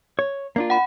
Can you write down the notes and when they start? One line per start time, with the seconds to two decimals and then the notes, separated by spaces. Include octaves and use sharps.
0.19 C#5
0.56 A#3 D4 F4
0.70 F#5 B5